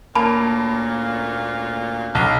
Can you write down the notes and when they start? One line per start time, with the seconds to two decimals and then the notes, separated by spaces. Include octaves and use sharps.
0.15 D2 A#2 A#3 C#4 A5 B5
2.15 B1 F5